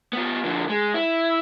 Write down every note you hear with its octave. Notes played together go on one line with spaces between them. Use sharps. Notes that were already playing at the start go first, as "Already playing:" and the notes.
B3 F4
D3 F3
G#3
E4